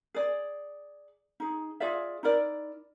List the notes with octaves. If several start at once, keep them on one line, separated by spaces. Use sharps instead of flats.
G#4 D5
D#4 G#4
F4 G#4 D5 E5
D#4 E4 A#4 D5